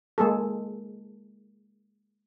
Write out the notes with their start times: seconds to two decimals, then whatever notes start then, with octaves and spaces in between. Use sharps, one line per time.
0.18 G#3 A#3 G#4 A4